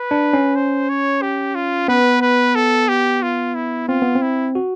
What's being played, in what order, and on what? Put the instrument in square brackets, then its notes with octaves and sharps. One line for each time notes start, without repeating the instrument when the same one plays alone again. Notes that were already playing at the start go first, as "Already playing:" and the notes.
Already playing: [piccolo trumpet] B4
[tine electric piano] D4
C#4
[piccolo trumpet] C5
C#5
G4
F4
[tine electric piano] B3 [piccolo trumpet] B4
[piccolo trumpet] B4
A4
G4
F4
E4
[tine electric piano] C4 [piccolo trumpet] F4
[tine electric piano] B3
C4
[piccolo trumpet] E4
[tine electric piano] F#4